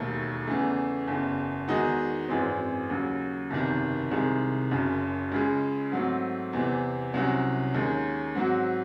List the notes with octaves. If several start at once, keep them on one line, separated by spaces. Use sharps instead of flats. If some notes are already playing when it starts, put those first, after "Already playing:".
Already playing: E1 D#2 D#3 A3
E2 C#3 E3 A3
F#1 E2 C#3
E2 D#3 G#3 D#4 F#4
G#1 F#2 E3 G#3 C4
D#2 C#3 F#3
F#1 E2 C3 D#3
C2 C3 D#3 G#3
F#1 F#2 C#3
C#2 C#3 G#3
G#2 F#3 A3 C4
E2 C3 E3 C4
C2 C3 F#3 C#4 F#4
D#2 D#3 G#3 C#4
G#2 F#3 C4 F#4